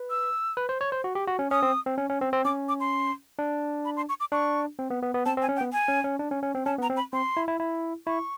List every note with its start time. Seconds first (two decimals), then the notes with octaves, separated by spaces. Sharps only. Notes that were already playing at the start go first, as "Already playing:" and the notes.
Already playing: B4
0.10 E6
0.57 B4
0.69 C5
0.81 C#5
0.92 C5
1.04 F#4
1.15 G4
1.27 F#4
1.39 C#4
1.51 C#4 D#6
1.63 C4
1.86 C4
1.98 C#4
2.09 C#4
2.21 C4
2.33 C4
2.45 C#4 D6
2.69 D6
2.80 C6
3.39 D4
3.85 B5
3.97 C6
4.09 C#6
4.20 D6
4.32 D4 C#6
4.79 C4
4.90 B3
5.02 B3
5.14 B3
5.25 C4 A5
5.37 C4
5.42 G#5
5.49 C#4
5.56 G5
5.61 B3
5.73 G#5
5.88 C#4
6.04 C#4
6.20 D4
6.31 C#4
6.43 C#4
6.55 C4
6.66 C#4 A5
6.78 B3
6.82 A#5
6.90 C4
6.97 B5
7.13 C4 C6
7.37 E4
7.48 E4
7.60 E4
8.07 E4 C#6